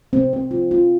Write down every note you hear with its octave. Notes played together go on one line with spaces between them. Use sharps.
C4
C4
F4
F4